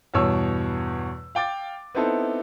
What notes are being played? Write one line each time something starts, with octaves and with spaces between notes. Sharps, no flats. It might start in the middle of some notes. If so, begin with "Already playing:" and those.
E2 G2 B2 C#5 E6
F5 G5 D6 A6
B3 C4 D#4 E4 A4